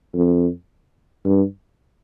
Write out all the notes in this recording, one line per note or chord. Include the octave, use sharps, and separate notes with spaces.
F2
G2